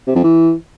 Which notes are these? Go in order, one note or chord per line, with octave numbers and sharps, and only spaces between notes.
C3
F2
E3